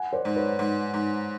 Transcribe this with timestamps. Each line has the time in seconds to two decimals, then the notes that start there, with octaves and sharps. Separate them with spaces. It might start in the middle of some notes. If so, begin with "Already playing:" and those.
Already playing: F#5 G#5
0.13 C5 D5
0.25 G#2
0.36 B4 C#5
0.59 G#2
0.94 G#2